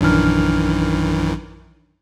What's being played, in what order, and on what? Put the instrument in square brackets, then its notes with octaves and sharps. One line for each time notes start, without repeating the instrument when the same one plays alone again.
[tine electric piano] A#1 D4 F6 [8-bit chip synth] F#2 D#3 E3